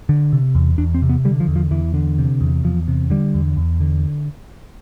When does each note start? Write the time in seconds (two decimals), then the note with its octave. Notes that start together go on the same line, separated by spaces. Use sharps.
0.09 D3
0.33 C3
0.55 E2
0.78 E2 D4
0.95 C4
1.02 C3
1.09 B3
1.25 D3 G3
1.40 F3
1.48 E2
1.56 F3
1.71 E2 E3
1.94 D3
2.18 C3
2.41 E2
2.64 E2 F3
2.88 C3
3.10 D3 G3
3.34 E2
3.57 E2
3.80 D3